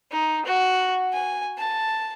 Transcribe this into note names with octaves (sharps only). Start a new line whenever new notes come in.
D#4
F#4
G#5
A5